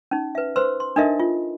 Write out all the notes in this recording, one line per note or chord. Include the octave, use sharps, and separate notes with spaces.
C#4 D#4
B4 E5
B4 C5 C6 E6
C6
D4 D#4 A4 A#4 D#5 E5
F4